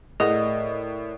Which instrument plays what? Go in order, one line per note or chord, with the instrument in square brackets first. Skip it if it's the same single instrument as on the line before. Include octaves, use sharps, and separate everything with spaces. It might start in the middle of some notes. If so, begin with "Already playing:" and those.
[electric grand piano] A2 [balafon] A3 G#4 [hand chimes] A#4 D5 [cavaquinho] D#5